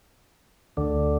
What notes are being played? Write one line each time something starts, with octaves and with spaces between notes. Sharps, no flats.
D2 D3